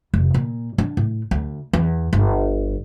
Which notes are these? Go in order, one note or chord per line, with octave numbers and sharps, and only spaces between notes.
F1
A#2
D4
A2
D2
E2
G1